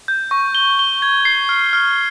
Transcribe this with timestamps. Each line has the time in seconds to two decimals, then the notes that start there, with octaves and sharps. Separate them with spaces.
0.08 G6
0.31 C#6
0.55 G7
0.79 G7
1.02 G#6
1.25 C7
1.49 F6
1.73 F6